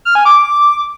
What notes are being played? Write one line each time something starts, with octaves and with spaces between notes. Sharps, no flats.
F6
G#5
D6
D6